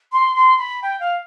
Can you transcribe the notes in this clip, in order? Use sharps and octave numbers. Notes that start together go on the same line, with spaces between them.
C6
C6
B5
G5
F5